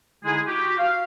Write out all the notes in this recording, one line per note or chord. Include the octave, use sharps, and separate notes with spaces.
D3 G#3 D#4 E4 G#4
F#4 G4
F5